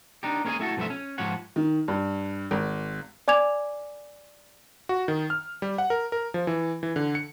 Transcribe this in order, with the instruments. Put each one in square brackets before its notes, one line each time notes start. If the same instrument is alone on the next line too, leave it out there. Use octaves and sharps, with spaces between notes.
[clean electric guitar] D4 D#4 G4
A#3 C#4 G#4 C#5 D#5 G#5
A3 E4 F#4 A4
B1 G2 F3 A3 B3 E5
C#4
G#2 F3 G4 C#5 F#5
[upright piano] D#3
G2
G#1
[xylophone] D5 G#5 D6 G#6 F7
[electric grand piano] F#4
D#3
F6
G3
F#5
A#4
A#4
F3
E3
E3
D3
C#7